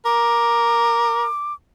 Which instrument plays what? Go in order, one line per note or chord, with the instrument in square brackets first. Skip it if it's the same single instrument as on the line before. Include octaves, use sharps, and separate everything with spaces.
[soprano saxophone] A#4 [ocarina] D6